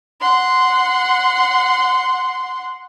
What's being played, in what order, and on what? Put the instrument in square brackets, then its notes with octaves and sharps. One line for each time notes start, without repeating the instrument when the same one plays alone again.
[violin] F#5 C6